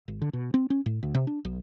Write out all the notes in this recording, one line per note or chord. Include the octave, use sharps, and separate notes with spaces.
G#1
D3
B2
C4
C#4
A2
D2
C3
D4
B1